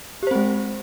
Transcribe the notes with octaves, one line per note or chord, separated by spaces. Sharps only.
G#3 C4 G4 C5